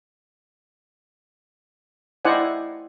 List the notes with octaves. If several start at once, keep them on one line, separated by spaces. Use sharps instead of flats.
E4 C5 D5 D#5 F#5 G#5